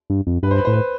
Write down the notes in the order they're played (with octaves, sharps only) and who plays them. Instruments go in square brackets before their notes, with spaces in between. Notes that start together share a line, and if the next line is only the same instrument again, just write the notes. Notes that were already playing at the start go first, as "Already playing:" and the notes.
[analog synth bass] G2
F2
[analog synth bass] G2 [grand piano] B4
[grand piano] C5
B4
C5
[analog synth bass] A2
[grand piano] B4